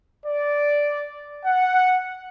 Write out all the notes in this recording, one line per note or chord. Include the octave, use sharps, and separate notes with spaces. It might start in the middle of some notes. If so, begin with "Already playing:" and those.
D5
F#5